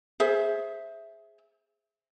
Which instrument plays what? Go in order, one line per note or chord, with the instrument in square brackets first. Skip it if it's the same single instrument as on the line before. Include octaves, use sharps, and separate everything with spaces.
[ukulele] G#4 C5 E5